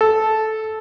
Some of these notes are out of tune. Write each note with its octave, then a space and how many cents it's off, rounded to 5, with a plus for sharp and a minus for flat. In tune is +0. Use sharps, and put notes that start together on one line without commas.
A4 -10